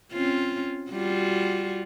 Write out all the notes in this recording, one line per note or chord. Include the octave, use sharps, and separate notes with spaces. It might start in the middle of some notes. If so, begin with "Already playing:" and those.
C4 C#4 F4
G3 F4 F#4